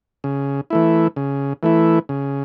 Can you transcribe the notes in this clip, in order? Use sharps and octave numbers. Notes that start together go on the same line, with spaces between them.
C#3
E3 A3 E4
C#3
E3 A3 E4
C#3